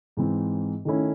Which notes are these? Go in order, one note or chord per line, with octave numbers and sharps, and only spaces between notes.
G#2 E3 C4
D#3 A3 C#4 E4